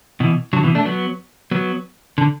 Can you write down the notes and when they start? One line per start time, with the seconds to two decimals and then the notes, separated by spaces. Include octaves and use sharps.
0.20 B2 E3
0.53 D3 F#3
0.63 B2 E3
0.75 A3 D4
0.85 F#3 B3
1.51 F#3 B3
2.18 D3